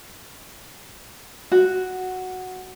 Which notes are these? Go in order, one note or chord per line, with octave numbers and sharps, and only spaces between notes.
F#4